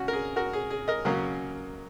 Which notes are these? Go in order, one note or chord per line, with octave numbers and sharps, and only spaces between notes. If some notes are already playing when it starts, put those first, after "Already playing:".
Already playing: C#3 C#4 F#4
A#4
G#4
F#4 A#4
G#4
G#4
A#4 D#5
C#3 F#3 A#3 C#4